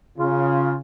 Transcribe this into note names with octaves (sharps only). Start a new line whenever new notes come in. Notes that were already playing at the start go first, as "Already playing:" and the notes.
C#3 F4